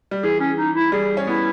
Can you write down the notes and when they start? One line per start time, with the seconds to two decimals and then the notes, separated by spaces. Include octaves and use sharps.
0.11 G3
0.23 E3 G#4
0.40 C#4
0.58 D#4
0.76 E4
0.92 G3 G#4
1.17 C#4
1.27 B3 E4